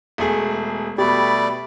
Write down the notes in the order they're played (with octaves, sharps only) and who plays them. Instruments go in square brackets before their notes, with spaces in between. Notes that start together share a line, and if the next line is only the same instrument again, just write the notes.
[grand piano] E1 A3 G#4
[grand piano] B2 [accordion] G3 A3 D5 [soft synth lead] G4 [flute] B5